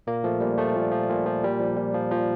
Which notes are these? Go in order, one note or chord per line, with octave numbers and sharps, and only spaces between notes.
A#2 A#3
F3 A3
A#2 G3
F3 A3
A#2
F3
A#2
F3
A#2 G3
F3
A#2
F3
A#2 F3